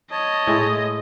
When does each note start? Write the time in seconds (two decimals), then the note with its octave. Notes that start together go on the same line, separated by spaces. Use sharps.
0.11 C#5 D#5 A5
0.47 A2 G#3 E4